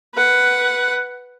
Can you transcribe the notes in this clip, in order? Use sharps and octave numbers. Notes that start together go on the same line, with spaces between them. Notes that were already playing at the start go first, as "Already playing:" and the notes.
B4 F#5